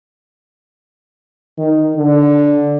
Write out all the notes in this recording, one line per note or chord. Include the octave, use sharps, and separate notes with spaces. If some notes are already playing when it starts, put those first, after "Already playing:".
D#3
D3